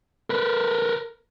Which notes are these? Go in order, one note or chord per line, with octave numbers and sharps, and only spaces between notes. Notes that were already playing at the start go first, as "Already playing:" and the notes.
A#4 B4